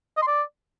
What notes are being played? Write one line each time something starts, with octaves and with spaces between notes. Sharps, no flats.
D#5
C6
D5